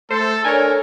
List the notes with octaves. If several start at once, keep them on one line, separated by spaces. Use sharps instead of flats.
A3 A4 C5
D4 A4 A#4 C#5 G#5